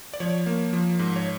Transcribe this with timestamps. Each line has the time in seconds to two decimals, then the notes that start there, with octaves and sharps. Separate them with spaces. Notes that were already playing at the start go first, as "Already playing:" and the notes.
0.13 D5
0.20 F3 C#5
0.46 A#3
0.73 F3
0.99 G#2
1.16 C#5